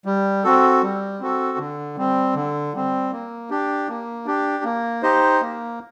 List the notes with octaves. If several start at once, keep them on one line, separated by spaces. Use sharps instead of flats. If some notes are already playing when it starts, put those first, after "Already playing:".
G3
C4 F#4 A4
G3
C4 F#4 A4
D3
G3 C4
D3
G3 C4
A#3
D4 G4
A#3
D4 G4
A#3
D#4 G4 C5 D#5
A#3